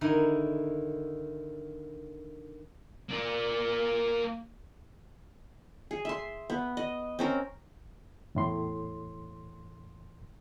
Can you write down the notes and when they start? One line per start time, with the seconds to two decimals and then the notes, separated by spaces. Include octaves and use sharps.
0.01 D3 D#3 E4 D#5 A#5
3.09 A#3 D5
5.91 G#4
6.05 E5 C6
6.50 B3
6.77 D#5
7.19 C4 C#4 A#4
8.35 E2 A2 C6